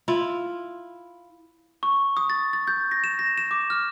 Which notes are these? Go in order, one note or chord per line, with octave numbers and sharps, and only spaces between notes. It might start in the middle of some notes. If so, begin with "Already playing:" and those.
E4 F4
C#6
D#6
A6
A6
G6
A#6
E7
A#6
E7
D6
F6